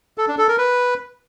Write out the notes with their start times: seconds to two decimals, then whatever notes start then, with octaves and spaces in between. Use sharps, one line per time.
0.18 A4
0.28 D4
0.38 A4
0.48 A#4
0.58 B4